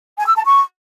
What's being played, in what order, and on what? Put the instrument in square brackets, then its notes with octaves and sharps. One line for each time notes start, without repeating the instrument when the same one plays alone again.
[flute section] G#5
E6
A5
C#6